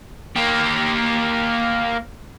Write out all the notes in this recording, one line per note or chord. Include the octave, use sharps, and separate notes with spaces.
A#3 G4